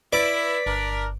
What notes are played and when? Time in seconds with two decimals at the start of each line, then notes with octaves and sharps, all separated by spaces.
0.13 E4 B4 D5 B6
0.66 G1 D4 A#4